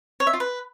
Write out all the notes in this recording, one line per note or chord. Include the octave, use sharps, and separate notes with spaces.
C#5
E5
F4
B4